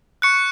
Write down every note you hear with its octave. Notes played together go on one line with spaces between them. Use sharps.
C#6 F#6 C#7